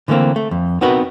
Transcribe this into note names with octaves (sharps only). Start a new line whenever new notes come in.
D3 E3 A3 A#3 C4
A3
F2
B3 C4 D#4 F#4 A#4 B4